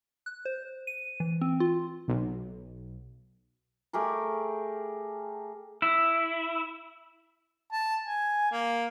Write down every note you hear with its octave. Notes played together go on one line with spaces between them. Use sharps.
F#6
C5
D#7
E3
C4
F4
B1
A3 G4 G#4 A#4
E4
A5
G#5
A#3